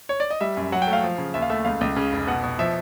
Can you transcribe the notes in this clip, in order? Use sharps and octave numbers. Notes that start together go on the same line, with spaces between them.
C#5
D5
D#5
G3 E5
F#2
F#3 F#5
G5
A3
F5
F3
C#3
D#2 E5
F5
A3 E5
C#2 F5
C#2
C#3
F1
B2 F#5
B2
F3 E5